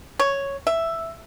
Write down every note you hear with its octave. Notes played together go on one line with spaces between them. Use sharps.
C#5
E5